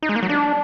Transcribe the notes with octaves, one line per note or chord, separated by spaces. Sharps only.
D#4
G#3
A#3
F#3
D4